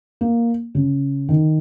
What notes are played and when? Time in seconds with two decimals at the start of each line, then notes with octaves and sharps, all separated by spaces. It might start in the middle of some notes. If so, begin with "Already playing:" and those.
0.21 A#3
0.75 C#3
1.29 D#3